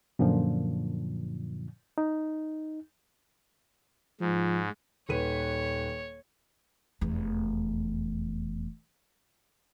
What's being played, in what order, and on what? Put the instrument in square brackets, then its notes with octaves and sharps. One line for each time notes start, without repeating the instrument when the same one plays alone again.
[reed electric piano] F#2 A#2 D3 F3
D#4
[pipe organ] G#2 [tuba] F3
[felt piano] D#1 B4 D#7 [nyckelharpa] C#5
[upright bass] F1 E2